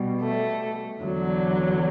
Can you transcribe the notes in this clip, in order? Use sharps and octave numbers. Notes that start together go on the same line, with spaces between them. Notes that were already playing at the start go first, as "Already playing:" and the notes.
Already playing: B2 G3
A3
E2 D3 F#3